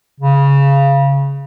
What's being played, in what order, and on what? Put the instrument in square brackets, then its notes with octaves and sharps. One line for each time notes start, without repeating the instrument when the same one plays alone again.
[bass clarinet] C#3